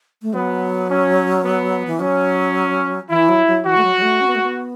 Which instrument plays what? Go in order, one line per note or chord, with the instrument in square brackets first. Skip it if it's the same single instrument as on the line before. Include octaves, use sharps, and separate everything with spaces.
[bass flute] A3
[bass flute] F#3 [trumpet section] B3
[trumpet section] C#4
B3
[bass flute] E3
[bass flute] F#3 [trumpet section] C#4
[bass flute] E3 [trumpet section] E4
[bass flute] F#3
F#3
[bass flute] E3 [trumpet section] F#4
[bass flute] A3
F#3
F#3
A3
C#4
B3
A3
B3